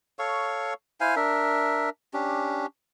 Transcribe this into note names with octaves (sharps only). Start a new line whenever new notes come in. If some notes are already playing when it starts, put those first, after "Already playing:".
A4 C#5 F5 C#6
E4 C5 F5 G#5
D4 A#4 E5
C#4 D4 G4